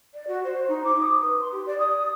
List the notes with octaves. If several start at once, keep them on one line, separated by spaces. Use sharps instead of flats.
D5
F#4
C5
D#4
D6
D#6
B4
C6
G4
D5
D#6